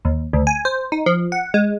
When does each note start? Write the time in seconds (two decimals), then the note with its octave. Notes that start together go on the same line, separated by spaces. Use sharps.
0.05 D#2
0.33 D2
0.47 G#5
0.65 C5
0.92 D#4
1.06 F3
1.32 F#5
1.54 G#3